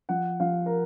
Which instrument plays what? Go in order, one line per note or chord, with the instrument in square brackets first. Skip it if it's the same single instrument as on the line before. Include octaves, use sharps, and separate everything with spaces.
[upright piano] F3 F#5
F3 F5
A#4